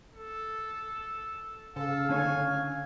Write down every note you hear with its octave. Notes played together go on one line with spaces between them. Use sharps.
A4
C#3 A4 F5
D3 C#4 C#5 G#5